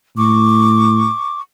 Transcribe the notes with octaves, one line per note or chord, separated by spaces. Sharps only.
A2 C#6 D6